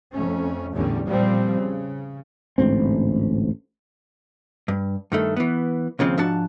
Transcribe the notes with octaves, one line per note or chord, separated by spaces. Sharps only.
F2 A3 C#4
A1 E2 A2 D3 G3 C#4
A#2 F3 G3 C4
C#3
A1 D2 G#2 C4
G2
G2 D#3 A3
E3 B3
D#2 C#3 F3 C4
G#2 F3 D4 F#4 A5